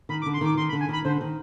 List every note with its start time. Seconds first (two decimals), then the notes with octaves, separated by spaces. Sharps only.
0.09 D#3 B5
0.22 D6
0.26 D3
0.34 C6
0.41 D#3 D6
0.57 D#3 C6
0.69 B5
0.73 D3
0.81 G#5
0.89 D#3 B5
1.05 D3 C5
1.21 D#3